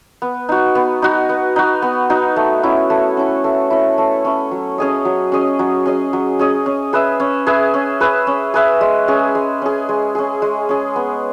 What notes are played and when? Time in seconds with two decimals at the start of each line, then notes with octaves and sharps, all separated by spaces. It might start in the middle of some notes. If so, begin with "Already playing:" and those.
0.22 B3
0.49 D#4 F#4
0.75 B3
1.02 D#4 F#4
1.29 B3
1.56 D#4 F#4
1.82 B3
2.10 D#4 F#4
2.36 A3
2.63 C#4 E4
2.90 A3
3.17 C#4 E4
3.44 A3
3.70 C#4 E4
3.98 A3
4.25 C#4 E4
4.51 F#3
4.78 C#4 G#4 D#5
5.05 F#3
5.32 C#4 G#4 D#5
5.59 F#3
5.86 C#4 G#4 D#5
6.13 F#3
6.39 C#4 G#4 D#5
6.66 C#4
6.93 G#4 B4 E5
7.20 C#4
7.47 G#4 B4 E5
7.74 C#4
8.00 G#4 B4 E5
8.27 C#4
8.54 G#4 B4 E5
8.81 G#3
9.08 C#4 G#4
9.35 G#3
9.62 C#4 G#4
9.89 G#3
10.15 C#4 G#4
10.42 G#3
10.69 C#4 G#4
10.96 B3